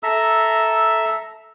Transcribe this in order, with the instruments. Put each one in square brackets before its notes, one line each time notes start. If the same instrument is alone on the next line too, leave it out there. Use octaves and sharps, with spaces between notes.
[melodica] A4 E5 A#5 E6